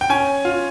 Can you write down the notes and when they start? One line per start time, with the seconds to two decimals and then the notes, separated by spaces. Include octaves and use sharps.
0.01 G5
0.10 C#4 G#5
0.45 F4